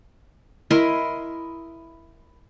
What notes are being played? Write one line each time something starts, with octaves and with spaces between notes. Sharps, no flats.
E4 A#4 D#5 C6